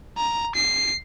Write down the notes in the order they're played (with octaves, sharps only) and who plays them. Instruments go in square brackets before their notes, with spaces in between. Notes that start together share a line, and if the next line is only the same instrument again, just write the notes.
[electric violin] A#5
C7